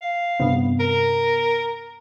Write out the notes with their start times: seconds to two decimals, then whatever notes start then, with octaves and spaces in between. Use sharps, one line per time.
0.02 F5
0.40 G2 C3 B3
0.80 A#4